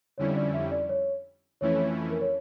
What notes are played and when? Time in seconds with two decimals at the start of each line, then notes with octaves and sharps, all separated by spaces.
0.18 F2 D3 G3 C#4 E4 C#5
0.36 D5
0.54 E5
0.71 D5
0.89 C#5
1.61 F2 E3 A3 C#4 E4 C#5
2.10 A#4
2.21 C#5